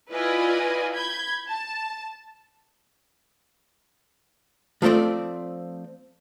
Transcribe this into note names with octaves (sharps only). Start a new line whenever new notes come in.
E4 F4 B4 D5 D#5 G#5
B5 G6 G#6
A5
F3 A3 A#3 C4 D5